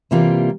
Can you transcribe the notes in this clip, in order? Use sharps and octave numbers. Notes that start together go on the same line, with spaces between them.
C3 E3 G3 A#3 F4